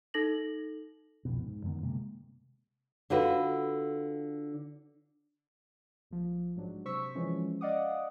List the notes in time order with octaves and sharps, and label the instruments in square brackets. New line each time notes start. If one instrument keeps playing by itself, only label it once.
[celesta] D#4 A4 A#6 F#7
[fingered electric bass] C2 F2 B2
G#2
F#2 D3 D#3 B3
C3 G#3 A#3
[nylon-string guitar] D3 F4 F#4 B4
[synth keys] A#1 F3
G#2 F#3 D4
C3 C5 C#6 E6 B6
E3 F3 G#3 C#4
D5 D#5 F5 F#5 D6 D#6